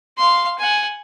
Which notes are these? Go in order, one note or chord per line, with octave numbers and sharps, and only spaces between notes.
F5 C6
F#5 G#5